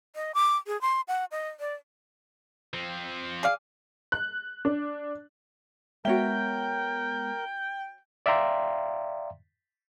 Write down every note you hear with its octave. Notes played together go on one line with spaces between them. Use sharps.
D#5
D6
G#4
C6
F#5
D#5
D5
F3 C4
G#4 D5 F5
F#6
D4
G#3 B3 F#4 A#4 C#5 E5 G5
D5 E5 F5 G5 A#5 C6